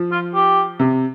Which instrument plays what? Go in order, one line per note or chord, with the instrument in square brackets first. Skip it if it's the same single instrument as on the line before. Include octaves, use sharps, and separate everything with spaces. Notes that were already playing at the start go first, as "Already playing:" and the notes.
Already playing: [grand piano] F3
[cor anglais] F4
G4
[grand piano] C3